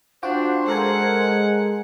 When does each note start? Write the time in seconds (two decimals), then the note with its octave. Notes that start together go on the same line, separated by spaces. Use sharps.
0.23 D4 F4 F#4 C5 G5
0.68 G#3 A4 A#4 F#5 G#5